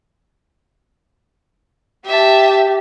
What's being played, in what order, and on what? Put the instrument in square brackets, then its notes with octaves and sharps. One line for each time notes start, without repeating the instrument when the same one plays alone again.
[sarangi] G4 [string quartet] E5 A5